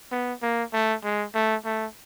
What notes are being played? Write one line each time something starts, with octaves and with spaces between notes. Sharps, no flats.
B3
A#3
A3
G#3
A3
A3